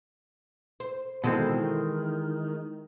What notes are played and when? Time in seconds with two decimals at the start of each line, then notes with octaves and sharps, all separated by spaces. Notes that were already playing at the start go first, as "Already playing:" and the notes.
0.80 C5
1.24 B2 D#3 E3 G#3 C4 A4
1.58 D#3